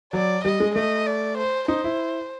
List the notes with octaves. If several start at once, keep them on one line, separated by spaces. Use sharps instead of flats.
F#3 D5
G3 D#5
G#3
A3 D#5
D5
C5
D#4 C5
E4